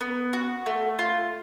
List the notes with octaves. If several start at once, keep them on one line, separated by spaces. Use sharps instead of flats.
B3
F#4
A3
F4